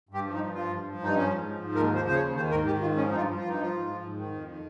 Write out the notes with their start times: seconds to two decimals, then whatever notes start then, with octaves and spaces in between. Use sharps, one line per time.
0.09 G2 G4
0.25 F3
0.34 D#4
0.39 G2
0.54 F3 F4
0.70 G2
0.84 F3
0.99 G2 D#4
1.15 F3 C#4
1.30 G#2
1.45 F3
1.60 G#2
1.75 D#2 A#4
1.90 F3 C5
2.05 C#3 C5
2.15 C#5
2.21 D#2
2.36 D#3 C5
2.51 G#2 A#4
2.66 D#3 G4
2.81 G#2 F4
2.96 F3 C#4
3.11 G2 D#4 F4
3.26 F3
3.36 F4
3.42 G2
3.49 D#4
3.57 F3
3.62 F4
3.72 G#2
3.87 F3
4.02 G#2
4.17 D#3
4.32 F2
4.47 D#3